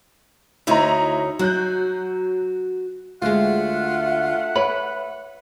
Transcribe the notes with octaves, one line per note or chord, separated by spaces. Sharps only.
D2 D#4 E4 C#5 D#5 A#5
F#3 F#4 F#6 G6
D2 G#3 A3 F4 E5 F#5
B4 C#5 B5